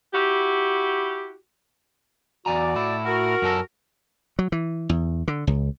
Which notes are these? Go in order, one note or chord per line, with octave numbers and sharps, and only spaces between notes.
E4 F#4 G4
E2 F#4 D5 G#5 A#5
A2 E4
F#4 A#4
F#2 C#4 A4
F#3
E3
E2
D3
C#2